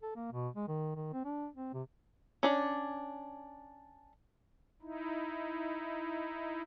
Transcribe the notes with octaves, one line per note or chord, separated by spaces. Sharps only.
A4
A#3
B2
G#3
D#3
D#3
C4
D4
C4
C3
C#4 D4 D5
D#4 E4